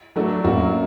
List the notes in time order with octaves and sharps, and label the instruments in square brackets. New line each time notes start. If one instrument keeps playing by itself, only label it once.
[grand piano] F#3 A3 D4 F#4 A4
F#2 F#3 A#3 D4 F#4